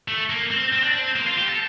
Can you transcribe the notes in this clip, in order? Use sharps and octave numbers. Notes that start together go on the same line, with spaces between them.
A3
A#3
C4
C4
D4
C4
A#3
F4
G4
A4